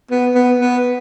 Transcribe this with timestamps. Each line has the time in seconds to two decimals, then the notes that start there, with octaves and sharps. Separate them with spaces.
0.11 B3
0.35 B3
0.60 B3